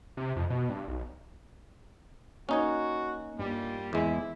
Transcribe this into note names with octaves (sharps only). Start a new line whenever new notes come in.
C3
F2
B2
G2
B1
A#3 C#4 D#4 F#4 C#5
G2 G3 A#3 F4
E2 G#3 E4